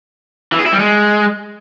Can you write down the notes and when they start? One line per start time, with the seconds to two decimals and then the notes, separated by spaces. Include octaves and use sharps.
0.52 E3
0.59 G#4
0.66 E4
0.72 G3
0.79 G#3